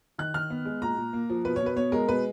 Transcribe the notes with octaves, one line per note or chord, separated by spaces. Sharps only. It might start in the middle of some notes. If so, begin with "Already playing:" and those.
D#3 F#6
D#3 F6
B3
G#3
A#2 A#5
A#2
A#3
F3
B2 B4
C#5
B2
B4
B3 C#5
G#3 A#4
B2 B4